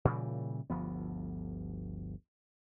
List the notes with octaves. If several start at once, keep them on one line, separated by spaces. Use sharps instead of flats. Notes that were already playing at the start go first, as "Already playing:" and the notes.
A#2 C#3 E3 G3
G1 D2 F3 B3